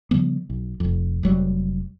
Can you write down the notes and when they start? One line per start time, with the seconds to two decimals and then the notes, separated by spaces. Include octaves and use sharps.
0.11 C#3 F3 G3 B3
0.50 B1
0.80 F1 F2
1.23 F1 F#3 G3